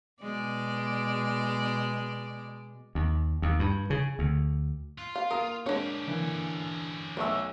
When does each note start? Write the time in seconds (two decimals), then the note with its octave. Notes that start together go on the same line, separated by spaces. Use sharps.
0.22 B2 G#3 D5
2.95 D#2
3.42 D#2
3.59 G2
3.90 C#3
4.19 D2
4.98 F4
5.16 F5
5.31 A#3 A#4 F5 D#6
5.66 G#3 C#4 D4 G4 C#5
6.06 D3 E3 A#3
7.17 B1 A3 C5 E5 C#6 E6